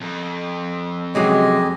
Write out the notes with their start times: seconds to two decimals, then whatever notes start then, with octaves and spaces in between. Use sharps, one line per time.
0.01 F2
1.15 F#2 C3 F#3 G#3 G4 D#5 G#5